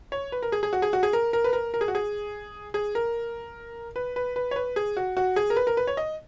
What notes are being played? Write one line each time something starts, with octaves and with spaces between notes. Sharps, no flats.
C#5
B4
A#4
G#4
G#4
F#4
G#4
F#4
G#4
A#4
A#4
B4
A#4
A#4
G#4
F#4
G#4
G#4
A#4
B4
B4
B4
C#5
B4
G#4
F#4
F#4
G#4
A#4
B4
A#4
B4
C#5
D#5